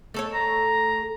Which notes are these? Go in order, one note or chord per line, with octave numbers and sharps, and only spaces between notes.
A3 A4 C#5
A#5